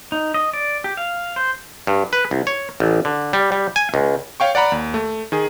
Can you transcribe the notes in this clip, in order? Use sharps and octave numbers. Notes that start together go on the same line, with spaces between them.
D#4
D#5
D5
G4
F5
C5
G2
B4
C2
C#5
A1
D3
G3
G3
G#5
C#2
C#5 F5 G5 C#6
D5 F#5 A#5 B5
D#2
A3
D#3 G#4